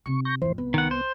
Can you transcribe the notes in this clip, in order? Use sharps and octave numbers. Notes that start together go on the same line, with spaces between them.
C3 D#4 C#6
C#6 G6 A#6
F2 A2 E3 C5
C2 B3
D#3 F#5
C5